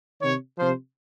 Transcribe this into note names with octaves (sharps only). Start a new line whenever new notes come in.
C3 D#3 C#5
C3 F3 C5